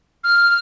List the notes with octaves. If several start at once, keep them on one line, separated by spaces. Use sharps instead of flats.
F6